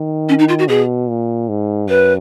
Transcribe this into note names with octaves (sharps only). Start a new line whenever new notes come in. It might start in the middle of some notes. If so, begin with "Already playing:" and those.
Already playing: D#3
C#4
D#4
F4
F#4
B2 G#4
A#2
G#2
F#2 B4